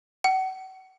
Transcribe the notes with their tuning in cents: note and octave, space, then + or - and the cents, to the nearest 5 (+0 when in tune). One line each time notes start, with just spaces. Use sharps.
F#5 +35